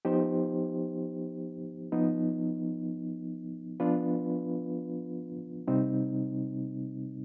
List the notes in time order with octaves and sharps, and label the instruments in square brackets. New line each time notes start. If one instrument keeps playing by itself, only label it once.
[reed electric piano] F3 B3 D#4 G4 C5
F3 B3 D#4
F3 B3 D4 F4 B4
C3 G3 C4 D#4